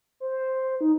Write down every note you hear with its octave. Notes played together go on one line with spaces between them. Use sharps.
C5
D#4